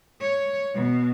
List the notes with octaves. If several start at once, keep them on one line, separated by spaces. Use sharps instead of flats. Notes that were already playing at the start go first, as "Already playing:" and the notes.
C#5
B2